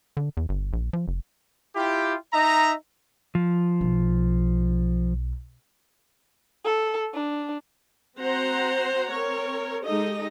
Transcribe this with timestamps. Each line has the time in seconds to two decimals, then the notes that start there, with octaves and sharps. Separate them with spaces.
0.17 D3
0.37 E2
0.49 G1
0.73 A#1
0.93 F3
1.08 F#1
1.76 E4 F4 G4
2.33 D#4 D#5 E5 A#5
3.35 F3
3.81 B1
6.65 A4
7.14 D4
8.17 C4 F#4 C5 F#5 A#5
9.10 C4 A#4 C#5
9.84 G#3 D#4 G4 A4 D#5